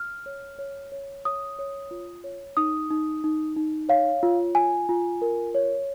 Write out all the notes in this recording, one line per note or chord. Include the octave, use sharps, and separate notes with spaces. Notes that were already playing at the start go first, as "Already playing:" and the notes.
Already playing: F6
C#5
C#5
C#5
C#5 D#6
C#5
F4
C#5
D#4 D#6
D#4
D#4
D#4
C#5 F5
F4
F4 G#5
F4
A#4
C#5